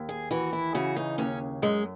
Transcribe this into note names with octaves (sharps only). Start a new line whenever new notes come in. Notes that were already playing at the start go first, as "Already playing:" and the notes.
Already playing: D#2
G#4
E3 F#4
E4
C#3 F#4
D#4
D#2 C#4
F#2 G#3